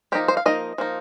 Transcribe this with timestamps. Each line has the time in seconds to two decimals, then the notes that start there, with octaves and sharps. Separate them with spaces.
0.12 F3 A#3 D#4 G4
0.28 C5
0.37 F5
0.46 F3 A#3 D#4 D#5
0.78 F3 A#3 D#4